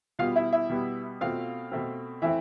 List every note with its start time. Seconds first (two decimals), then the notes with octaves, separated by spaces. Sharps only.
0.19 B2 G3 B3 F4 F5
0.36 E4 E5
0.52 E4 E5
0.69 B2 G3 B3
1.21 B2 A3 C4 F4 F5
1.72 B2 A3 C4
2.22 E3 A3 C4 E4 E5